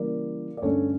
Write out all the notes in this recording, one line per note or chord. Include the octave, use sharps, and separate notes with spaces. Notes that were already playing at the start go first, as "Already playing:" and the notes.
Already playing: C#3 E3 G3 A#3 A#4 D5
D5
G2 D3 A3 C#4 A4 C#5